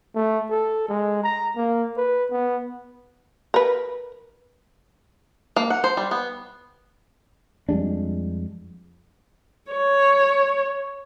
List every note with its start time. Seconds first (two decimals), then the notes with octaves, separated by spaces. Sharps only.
0.15 A3
0.50 A4
0.89 G#3
1.23 A#5
1.56 A#3
1.97 B4
2.31 B3
3.54 A#4 B4
5.56 A#3
5.70 F#5
5.84 C5
5.97 G3
6.11 B3
7.69 F2 G3 G#3 D4
9.72 C#5